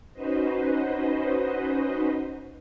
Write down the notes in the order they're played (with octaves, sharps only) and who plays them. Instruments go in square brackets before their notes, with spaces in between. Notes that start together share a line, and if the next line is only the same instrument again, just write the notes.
[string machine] C#4 D#4 F#4 B4 C5 D#5